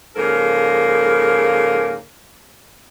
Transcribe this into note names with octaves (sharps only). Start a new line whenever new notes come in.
G#2 C#3 F3 A#3 A4 A#4